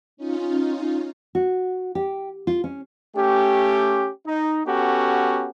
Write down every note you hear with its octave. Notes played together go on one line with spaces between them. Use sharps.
C#4 D#4 F4
F#4
G4
F4
C#4
A3 C#4 G4
D#4
B3 C#4 F#4 G4 A4